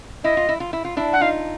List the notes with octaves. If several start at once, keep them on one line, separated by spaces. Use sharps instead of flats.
E4 D#5
F4
E4
F4
E4
F4
D4 E4
F#5
D#4 F4 F5